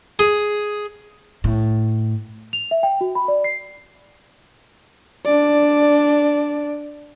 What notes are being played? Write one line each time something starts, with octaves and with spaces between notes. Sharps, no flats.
G#4
A2
F7
E5
G5
F#4
B5
D5
C7
D4 D5